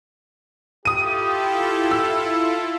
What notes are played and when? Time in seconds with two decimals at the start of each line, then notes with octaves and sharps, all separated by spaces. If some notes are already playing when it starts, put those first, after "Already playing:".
0.85 E4 F4 G4 A4 D#6 D#7
1.91 E6